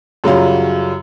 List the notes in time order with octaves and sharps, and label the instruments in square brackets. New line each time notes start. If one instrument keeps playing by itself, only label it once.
[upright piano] F#2 C#3 F#3 G3 F4